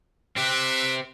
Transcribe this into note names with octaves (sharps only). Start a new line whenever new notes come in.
C4 G4 B4 E5